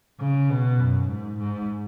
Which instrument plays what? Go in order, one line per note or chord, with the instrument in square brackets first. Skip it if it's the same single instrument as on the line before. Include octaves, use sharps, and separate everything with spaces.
[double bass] C#3
B2
F#2
G#2
G#2